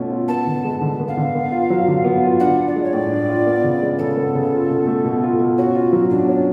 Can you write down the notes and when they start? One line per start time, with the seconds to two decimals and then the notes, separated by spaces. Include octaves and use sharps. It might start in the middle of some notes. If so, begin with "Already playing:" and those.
Already playing: B2 A3 C#4 F4
0.11 F4
0.28 B3 A5
0.47 D3
0.64 G#3
0.81 D3
1.00 B3
1.08 F5
1.17 D3
1.35 B3
1.52 F4
1.70 F#3
1.88 D3
2.04 B3
2.23 F4
2.40 D4 F#5
2.57 F4
2.67 D5
2.76 G#3
2.84 C#5
2.93 A2 D5
3.11 D4
3.29 F4
3.46 B3
3.64 C#3
3.82 G#3
3.99 C#3 A4
4.16 B3
4.35 C#3
4.52 F4
4.70 B2
4.87 A3
5.05 B2
5.23 F4
5.40 B2
5.58 C#4 F#4
5.75 F4
5.93 F#3
6.10 B2 D4
6.29 C#4